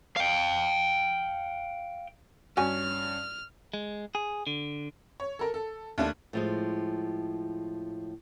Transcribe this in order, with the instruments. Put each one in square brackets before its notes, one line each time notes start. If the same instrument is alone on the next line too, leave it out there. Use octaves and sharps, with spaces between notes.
[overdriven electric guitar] F5 G5
[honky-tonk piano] G2 C#4 [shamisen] F#4 G#5 [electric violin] F6
[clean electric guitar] G#3
G#4
D3
[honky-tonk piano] C#5
A4 A#4
A4
D#2 A3 D4
[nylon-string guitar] A2 F3 G#3